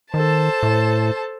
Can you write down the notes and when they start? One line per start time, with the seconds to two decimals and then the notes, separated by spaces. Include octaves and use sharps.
0.14 D#3 A4 C5 A5
0.63 A2